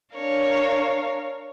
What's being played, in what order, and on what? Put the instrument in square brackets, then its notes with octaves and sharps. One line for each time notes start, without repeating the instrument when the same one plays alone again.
[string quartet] D4 A#4 C#5 F5